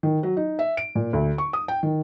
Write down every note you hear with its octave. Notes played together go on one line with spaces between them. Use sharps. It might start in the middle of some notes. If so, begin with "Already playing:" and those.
D#3
F#3
D#4
E5
D7
A#2
D2
C#6
D#6
G5
D#3